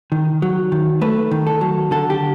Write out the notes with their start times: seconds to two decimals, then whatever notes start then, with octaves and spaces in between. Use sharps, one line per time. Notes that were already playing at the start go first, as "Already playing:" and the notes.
0.12 D#3
0.42 F#3
0.72 D#3
1.01 A3 B4
1.31 D#3
1.47 A4
1.61 F#3
1.91 D3 A4
2.10 G4